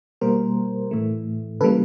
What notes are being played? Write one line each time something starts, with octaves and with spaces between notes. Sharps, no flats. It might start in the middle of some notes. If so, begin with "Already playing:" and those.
B2 G3 A#3 A#4 C5
A2 E3 A3
C#3 E3 G3 A#3 A4 B4